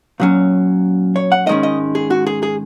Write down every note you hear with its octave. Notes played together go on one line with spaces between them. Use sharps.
A#2 F#3 C#4
C#5
F#5
G#2 D#3 G#3 C#4 D#5
D#5
G#4
F#4
G#4
G#4